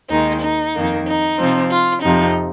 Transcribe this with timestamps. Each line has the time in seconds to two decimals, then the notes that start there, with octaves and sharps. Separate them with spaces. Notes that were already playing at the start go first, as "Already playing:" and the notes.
0.10 D#2 D#3 G#3 D#4
0.42 D#4
0.74 F2 D#3 A#3
1.06 D#4
1.38 C3 F3 C4
1.70 F4
2.02 F2 C3 F3 D#4